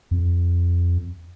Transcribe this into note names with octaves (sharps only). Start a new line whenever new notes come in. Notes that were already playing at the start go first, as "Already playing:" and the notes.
F2